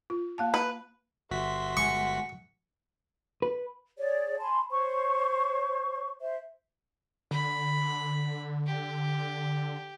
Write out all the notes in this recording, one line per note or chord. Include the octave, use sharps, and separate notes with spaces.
F4
A#3 F5 A5
B4
G1 F#4 E5 C6 B6
G#3 F#5 G#5 C#6
B4
G#4 C#5 D5
G#5 A5 B5 C6
C5 C#5 C#6
C5 E5
D3 B5
G4